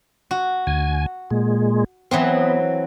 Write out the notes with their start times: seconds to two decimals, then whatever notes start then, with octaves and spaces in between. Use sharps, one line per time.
0.31 F#4
0.67 D2 G#5
1.30 A#2 G#3
2.11 E3 F#3 B3 C4